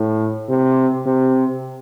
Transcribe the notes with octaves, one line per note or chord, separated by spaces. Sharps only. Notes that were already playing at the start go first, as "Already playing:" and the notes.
Already playing: A2
C3
C3